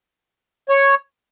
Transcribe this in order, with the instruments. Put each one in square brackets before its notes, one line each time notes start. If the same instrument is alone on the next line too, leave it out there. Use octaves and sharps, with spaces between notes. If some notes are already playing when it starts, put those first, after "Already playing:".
[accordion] C#5